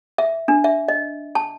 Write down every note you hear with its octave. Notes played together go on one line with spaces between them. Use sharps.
E5
D4
E5
D#5
A5